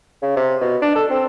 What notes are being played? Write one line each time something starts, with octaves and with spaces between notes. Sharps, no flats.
C#3
C3
B2
D4
A4
C4